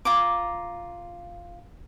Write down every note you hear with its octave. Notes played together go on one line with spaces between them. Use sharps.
F4 A#5 D6